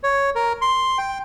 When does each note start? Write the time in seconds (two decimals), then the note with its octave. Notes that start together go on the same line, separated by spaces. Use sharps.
0.03 C#5
0.35 A#4
0.61 C6
0.98 G5